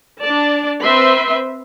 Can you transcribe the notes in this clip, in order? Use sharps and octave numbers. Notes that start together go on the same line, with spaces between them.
D4 D5 A5
C4 B4 E5 C6